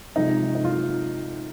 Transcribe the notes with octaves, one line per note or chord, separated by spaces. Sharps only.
C3 F3 G#3 D#4
D#4
F4